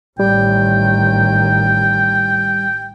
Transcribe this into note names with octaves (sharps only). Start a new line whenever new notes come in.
A1 D#3 G3 G5